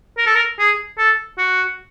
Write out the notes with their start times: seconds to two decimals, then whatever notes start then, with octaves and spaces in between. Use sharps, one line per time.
0.18 A#4
0.26 A4
0.35 A#4
0.59 G#4
0.98 A4
1.38 F#4